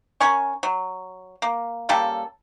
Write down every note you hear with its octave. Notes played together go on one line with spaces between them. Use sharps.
C#4 A#4 G#5 C#6
F#3
A#3
C#3 G3 A#3 A4